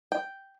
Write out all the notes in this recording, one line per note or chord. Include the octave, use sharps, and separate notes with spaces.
G5